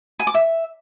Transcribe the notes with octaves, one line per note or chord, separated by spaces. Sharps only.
G#5
D6
E5